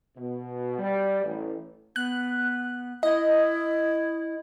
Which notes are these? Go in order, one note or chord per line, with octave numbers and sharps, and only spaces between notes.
B2
G3
A1
B3 F#6
E4 D#5